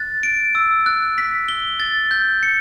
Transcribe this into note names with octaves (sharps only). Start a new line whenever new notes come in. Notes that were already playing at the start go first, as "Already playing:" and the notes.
Already playing: F#6 A6
D7
E6
F#6
B6
G7
A6
G6
C#7